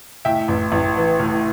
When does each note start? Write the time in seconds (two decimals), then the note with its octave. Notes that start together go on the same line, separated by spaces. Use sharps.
0.25 A2 E5 G5
0.48 A1
0.72 A1
0.96 E3
1.20 A2